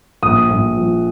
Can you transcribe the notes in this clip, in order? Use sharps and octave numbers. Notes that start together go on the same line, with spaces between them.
A#1 D#6
A#1
F3